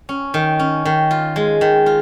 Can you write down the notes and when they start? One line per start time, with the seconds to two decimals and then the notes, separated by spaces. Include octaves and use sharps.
0.09 C#4
0.34 D#3
0.59 C#4
0.85 D#3
1.11 F4
1.36 G#3
1.61 D#3
1.86 F4